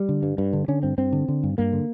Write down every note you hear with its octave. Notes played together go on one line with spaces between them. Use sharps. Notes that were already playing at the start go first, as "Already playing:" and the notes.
Already playing: G3
D3
G2
G2
D3
D3 C#4
G2 C4
G2 C4
D3
D3
G2
G2 A#3
D3